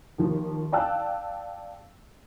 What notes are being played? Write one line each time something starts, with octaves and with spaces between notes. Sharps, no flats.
D#2 F3
D5 F5 G5 A5 E6 F#6